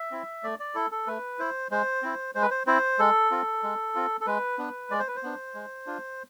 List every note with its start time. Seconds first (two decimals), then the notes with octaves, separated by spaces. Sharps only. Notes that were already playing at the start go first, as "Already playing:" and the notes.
Already playing: E5
0.11 C4 E4
0.43 A3 D5
0.59 D5
0.75 E4 A4
0.92 A4
1.07 A3 B4
1.39 E4 C5
1.71 G#3 C5
2.03 C4 E4
2.35 G#3 C5
2.42 B4
2.51 C5
2.67 C4 E4 C5
2.99 G#3 A4
3.31 C4 F4
3.63 G#3
3.95 C4 F4
4.21 A4
4.26 G#3 B4
4.58 B3 D4
4.90 G#3 D5
4.99 C5
5.08 B4
5.16 C5
5.23 B3 D4
5.55 G#3
5.87 D4 F4